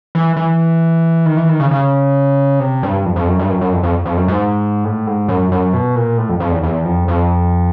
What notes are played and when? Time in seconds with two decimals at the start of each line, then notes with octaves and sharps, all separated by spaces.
0.15 E3
0.36 E3
1.26 D#3
1.37 E3
1.49 D#3
1.60 C#3
1.71 C#3
2.60 C3
2.83 G2
3.05 F2
3.16 F2
3.28 F#2
3.39 G2
3.50 F#2
3.61 F#2
3.73 F2
3.83 F2
4.05 F2
4.17 F#2
4.28 G#2
4.84 A2
5.07 G#2
5.28 F#2
5.52 F#2
5.73 B2
5.96 A#2
6.18 A2
6.29 F2
6.40 F2
6.52 E2
6.63 E2
6.85 F2
7.08 F2